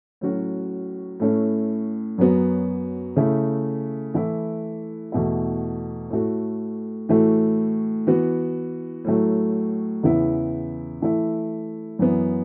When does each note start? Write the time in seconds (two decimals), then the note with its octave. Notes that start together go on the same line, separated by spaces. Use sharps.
0.21 A2 F#3 C#4 F#4
1.20 A2 A3 C#4 E4
2.18 F#2 F#3 B3 F#4
3.16 C#3 A3 E4
4.14 E3 A3 E4
5.12 E2 B2 A3 E4
6.10 A2 A3 F#4
7.09 A2 E3 A3 F#4
8.07 E3 B3 F#4
9.05 A2 F#3 A3
10.03 E2 C#3 E3 B3 E4
11.02 E3 A3 E4
11.99 F#2 E3 B3 E4